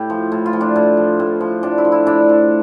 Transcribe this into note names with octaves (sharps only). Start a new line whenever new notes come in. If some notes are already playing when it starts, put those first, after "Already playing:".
Already playing: A2 G4
F3
A2
F4
F3
D4
A2
F3
A2
F3
A2 D4
E4
F3
E4
A2 D4
F3